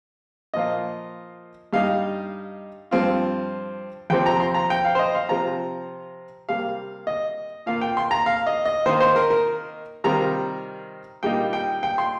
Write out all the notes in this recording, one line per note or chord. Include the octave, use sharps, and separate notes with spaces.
A#2 F3 A#3 F4 D#5
G2 G3 D#4 F5
G2 F3 C4 F4
F2 C3 F3 C4 G5
A#5
C6
A#5
G5
F5
C5
D#5
F5
C3 F3 C4 F4 A#5
C3 G3 A#3 F5
D#5
A#2 A#3 F4 F5
G5
C6
A#5
F5
D#5
D#5
D#3 A#3 D#4 C5
C5
A#4
A#4
C3 D#3 G3 C4 F4 A#5
A#2 G3 A#3 D#4 G5
G5
G5
C6